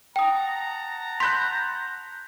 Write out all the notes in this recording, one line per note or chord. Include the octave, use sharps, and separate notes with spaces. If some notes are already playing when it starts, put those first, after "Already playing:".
F#5 G5 A5 A#5 D#6
B5 C6 F#6 G6 B6